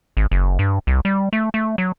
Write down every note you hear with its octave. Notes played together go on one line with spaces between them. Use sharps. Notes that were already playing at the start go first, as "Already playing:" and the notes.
G#1
F#1
G2
C2
G3
A3
A3
F#3